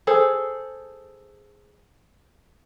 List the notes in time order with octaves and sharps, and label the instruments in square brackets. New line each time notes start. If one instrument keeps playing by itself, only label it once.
[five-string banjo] G#4 A4 C5